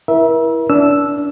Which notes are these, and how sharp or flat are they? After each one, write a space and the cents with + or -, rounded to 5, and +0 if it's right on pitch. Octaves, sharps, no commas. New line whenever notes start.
E4 +0 A#4 +45 E5 -10
D4 -30 E6 +0